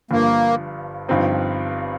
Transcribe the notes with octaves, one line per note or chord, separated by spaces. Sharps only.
G1 G2 F3 A#3
G1 G2 F3 C4 D#4